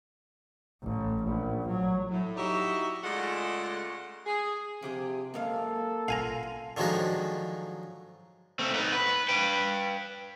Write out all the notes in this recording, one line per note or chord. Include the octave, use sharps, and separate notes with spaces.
A1
A#1
F#3
A2
D#4 E4 F#4 G4 D5 E5
C#3 G#3 A3 F4 D5 F#5
G#4
C3 F3 G4 G#4
F#2 G#3 A#3 A4 F5
F4 F5 G#5 A#5
D3 D#3 F3 F#3 G#3 D#4
A3 C4
B3 D#4
B4
B4 G5